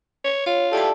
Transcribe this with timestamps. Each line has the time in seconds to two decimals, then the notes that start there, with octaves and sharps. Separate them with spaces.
0.24 C#5
0.46 F4 C#5
0.73 E4 G4 A4 D5 A5